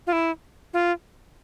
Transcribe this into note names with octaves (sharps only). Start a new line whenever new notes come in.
F4
E4
F4